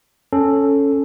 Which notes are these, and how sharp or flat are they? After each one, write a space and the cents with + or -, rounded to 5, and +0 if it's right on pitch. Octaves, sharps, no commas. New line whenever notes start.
C#4 +0 A4 +0